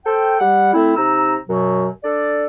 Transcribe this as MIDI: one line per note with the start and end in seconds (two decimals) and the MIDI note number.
0.04 0.35 69
0.04 0.35 72
0.04 0.35 79
0.40 0.73 55
0.40 0.73 78
0.73 0.92 57
0.73 0.92 60
0.73 0.92 64
0.96 1.35 48
0.96 1.35 63
0.96 1.35 82
0.96 1.35 88
1.48 1.87 42
1.48 1.87 47
1.48 1.87 54
2.03 2.45 62
2.03 2.45 69
2.03 2.45 74